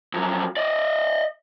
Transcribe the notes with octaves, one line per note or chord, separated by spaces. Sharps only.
F2 F#3
D5 D#5